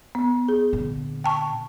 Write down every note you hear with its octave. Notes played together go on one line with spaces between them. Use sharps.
B3
G#4
A#2 D3
G5 A5 C#6